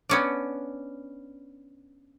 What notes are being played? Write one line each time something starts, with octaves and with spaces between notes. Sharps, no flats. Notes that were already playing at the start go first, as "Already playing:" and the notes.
B3 C#4 D4